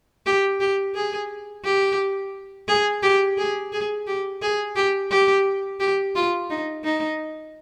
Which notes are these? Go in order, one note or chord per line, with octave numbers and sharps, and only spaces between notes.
G4
G4
G#4
G4
G#4
G4
G#4
G#4
G4
G#4
G4
G4
G4
F4
D#4
D#4